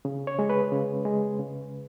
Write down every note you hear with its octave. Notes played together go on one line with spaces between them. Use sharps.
C#3
C#5
G#3
B4
C#3
G#3
C#3